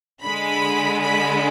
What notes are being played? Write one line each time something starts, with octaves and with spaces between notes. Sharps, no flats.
D3 G#3 B5
B5